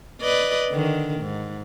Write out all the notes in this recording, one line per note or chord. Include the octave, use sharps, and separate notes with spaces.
B4 D5 D#5
D3 D#3
G#2